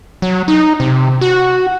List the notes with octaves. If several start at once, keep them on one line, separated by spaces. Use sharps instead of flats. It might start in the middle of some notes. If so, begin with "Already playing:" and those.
F#3
D#4
C3
F#4